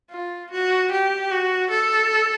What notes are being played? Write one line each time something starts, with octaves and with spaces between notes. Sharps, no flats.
F4
F#4
G4
F#4
A4